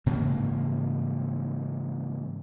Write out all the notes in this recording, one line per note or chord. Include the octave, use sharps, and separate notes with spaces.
G#2 C#3 E3 A#3